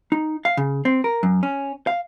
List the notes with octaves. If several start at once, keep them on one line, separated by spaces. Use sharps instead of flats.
D#4
F5
C#3
C4
A#4
F#2
C#4
F5